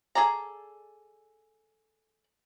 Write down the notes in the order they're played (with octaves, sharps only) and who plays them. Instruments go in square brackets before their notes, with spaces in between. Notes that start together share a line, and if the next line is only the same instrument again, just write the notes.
[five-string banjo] G#4 A4 D5 A#5